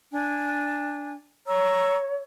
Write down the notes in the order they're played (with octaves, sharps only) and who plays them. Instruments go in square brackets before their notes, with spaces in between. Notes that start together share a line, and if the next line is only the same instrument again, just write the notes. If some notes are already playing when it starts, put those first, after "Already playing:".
[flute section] D4 G#5
[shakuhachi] C#5 [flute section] A#5 C#6 E6